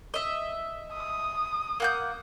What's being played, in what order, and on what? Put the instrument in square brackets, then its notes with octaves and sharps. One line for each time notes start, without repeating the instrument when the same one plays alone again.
[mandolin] D#5 E5
[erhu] D#6
[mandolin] A#3 F#5 G6